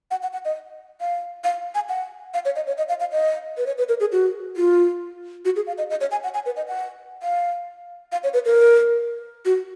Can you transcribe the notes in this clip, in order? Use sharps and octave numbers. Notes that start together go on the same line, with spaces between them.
F#5
F#5
F#5
D#5
F5
F5
G#5
F#5
F5
C#5
D#5
C#5
D#5
F5
F5
D#5
B4
C#5
B4
A#4
G#4
F#4
F4
F#4
G#4
F5
D#5
D#5
C#5
G#5
F#5
G#5
B4
D#5
F#5
F5
F5
C#5
B4
A#4
F#4